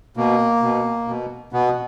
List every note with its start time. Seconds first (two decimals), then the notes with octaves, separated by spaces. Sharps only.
0.17 B2 A#3
0.63 B2
1.08 B2
1.53 B2 B3